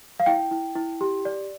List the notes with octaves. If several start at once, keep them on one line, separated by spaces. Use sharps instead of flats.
F5
E4 G5
E4
E4
G4
D5